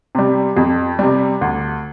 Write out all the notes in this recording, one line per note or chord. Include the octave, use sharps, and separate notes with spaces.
C3 G3
F2
C3 G3
D2